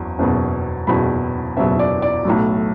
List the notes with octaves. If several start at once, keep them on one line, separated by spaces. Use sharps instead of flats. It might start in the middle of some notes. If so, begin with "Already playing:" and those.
Already playing: F#1 E2 F#3
F#1 E2 B2 F#3
F#1 E2 B2 F#3 B5
F#1 E2 B2 F#3 E5
D5
D5
B1 A2 F#3